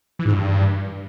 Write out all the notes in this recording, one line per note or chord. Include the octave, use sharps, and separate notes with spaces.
E3
G#2
G2